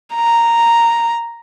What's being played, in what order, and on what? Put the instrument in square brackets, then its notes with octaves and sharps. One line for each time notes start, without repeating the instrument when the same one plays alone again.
[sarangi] A#5